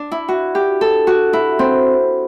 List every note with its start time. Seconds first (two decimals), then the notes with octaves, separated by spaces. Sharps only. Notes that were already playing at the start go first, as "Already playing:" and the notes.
Already playing: D4
0.11 E4
0.28 F#4
0.55 G4
0.81 A4
1.07 F#4
1.33 E4
1.59 C4